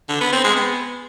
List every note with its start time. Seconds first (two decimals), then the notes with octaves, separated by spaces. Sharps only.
0.09 D3
0.20 B3
0.32 C4
0.44 G#3
0.56 B3